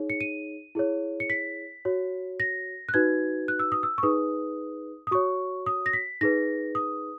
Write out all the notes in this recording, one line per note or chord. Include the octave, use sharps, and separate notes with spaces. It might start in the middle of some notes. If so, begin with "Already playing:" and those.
Already playing: D#4 G#4 C#5
C#7
D#7
E4 G#4 C#5
C#7
B6
F#4 C#5
A#6
F#6
D#4 F#4 B4 G#6
F#6
E6
D#6
E6
C#6
D#4 G#4 B4 D#6
D#6
F#4 C#5 C#6
D#6
A#6
B6
D#4 G#4 B4 A#6
D#6